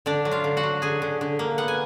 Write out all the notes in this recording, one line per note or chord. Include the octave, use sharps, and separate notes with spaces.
D3 D4 D5
F#3
F4 F5
D3
F#4 F#5
F#3
D3 G#4 G#5
D3
D3
A#3
B3 F#5
G#5